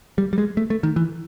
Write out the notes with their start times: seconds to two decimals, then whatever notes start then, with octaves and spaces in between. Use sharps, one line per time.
0.18 G3
0.33 G3
0.38 G#3
0.57 A3
0.70 A3
0.83 D#3
0.96 E3